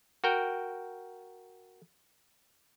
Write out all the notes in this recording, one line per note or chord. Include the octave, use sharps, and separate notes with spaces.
F#4 A#4 G5